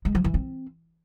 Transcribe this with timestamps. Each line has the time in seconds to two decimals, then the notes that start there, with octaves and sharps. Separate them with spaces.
0.05 G#3
0.15 F3
0.24 E3
0.34 C4